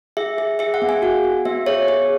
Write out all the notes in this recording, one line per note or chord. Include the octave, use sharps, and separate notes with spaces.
G#4 E5
G#4
G#4 E5
F#5
B3
G#5
F#4 F#5
F#4
B3 E5
G#4 C#5
G#4